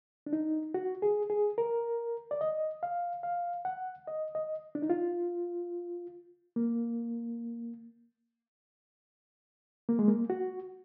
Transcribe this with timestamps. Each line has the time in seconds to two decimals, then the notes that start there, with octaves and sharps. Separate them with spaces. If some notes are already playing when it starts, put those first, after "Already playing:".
0.26 D4
0.33 D#4
0.74 F#4
1.02 G#4
1.30 G#4
1.58 A#4
2.31 D5
2.41 D#5
2.83 F5
3.23 F5
3.65 F#5
4.07 D#5
4.35 D#5
4.75 D4
4.82 D#4
4.90 F4
6.56 A#3
9.89 A#3
9.99 G#3
10.08 A#3
10.30 F#4